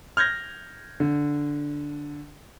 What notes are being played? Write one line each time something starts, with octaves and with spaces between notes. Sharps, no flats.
F6 G6 G#6 A#6
D3